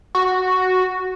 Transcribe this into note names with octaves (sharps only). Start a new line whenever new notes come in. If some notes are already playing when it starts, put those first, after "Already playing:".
F#4